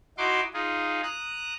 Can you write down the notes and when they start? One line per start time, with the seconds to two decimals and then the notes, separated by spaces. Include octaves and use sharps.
0.18 D#4 E4 F#4 C6 D6
0.54 D#4 F4 G#4
1.03 A#5 D#6 F#6